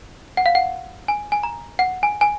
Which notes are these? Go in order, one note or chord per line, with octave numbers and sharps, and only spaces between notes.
F#5
F5
F#5
G#5
G#5
A#5
F#5
G#5
G#5